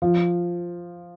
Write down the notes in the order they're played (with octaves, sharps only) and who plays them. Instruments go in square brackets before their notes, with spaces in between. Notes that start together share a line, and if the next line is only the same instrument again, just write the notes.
[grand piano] F3